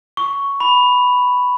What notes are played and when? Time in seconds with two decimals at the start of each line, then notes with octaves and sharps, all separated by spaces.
0.17 C#6
0.60 B5